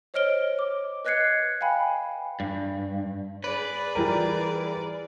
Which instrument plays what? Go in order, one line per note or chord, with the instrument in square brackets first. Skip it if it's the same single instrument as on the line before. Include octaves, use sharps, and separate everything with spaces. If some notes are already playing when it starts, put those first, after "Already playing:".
[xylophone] C5 C#5 D#5 F6 D7 G7
D6
B4 D#5 F#6 G#6 C7 C#7
F5 G5 G#5 B5
[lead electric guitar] G2
[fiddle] G#4 D5 [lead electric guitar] B4
[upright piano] E3 G3 A#4